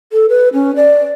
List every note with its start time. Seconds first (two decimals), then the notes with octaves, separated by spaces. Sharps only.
0.13 A4
0.29 B4
0.53 C#4
0.76 D5